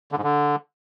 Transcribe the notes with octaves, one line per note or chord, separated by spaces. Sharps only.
D3
G#2
D3